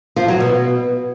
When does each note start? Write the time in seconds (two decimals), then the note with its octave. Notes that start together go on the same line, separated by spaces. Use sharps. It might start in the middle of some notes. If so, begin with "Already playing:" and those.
0.16 F3
0.28 F#3
0.40 B2